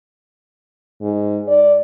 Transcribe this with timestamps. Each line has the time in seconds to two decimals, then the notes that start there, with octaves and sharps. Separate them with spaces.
1.02 G#2
1.48 D5